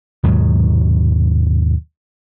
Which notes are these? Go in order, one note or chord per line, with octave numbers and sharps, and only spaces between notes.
D#2 G#2 B2 F#3